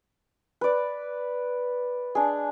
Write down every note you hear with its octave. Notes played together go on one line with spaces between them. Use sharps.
B4 D5
D4 G#4